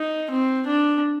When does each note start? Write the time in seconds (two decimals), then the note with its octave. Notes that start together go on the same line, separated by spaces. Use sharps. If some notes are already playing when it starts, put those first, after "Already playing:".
Already playing: D#4
0.30 C4
0.66 D4